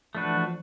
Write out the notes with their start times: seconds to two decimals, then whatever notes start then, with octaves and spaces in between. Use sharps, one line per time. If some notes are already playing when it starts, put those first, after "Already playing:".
0.15 F3 A3 D4 F#4 B4
0.25 E3
0.35 F3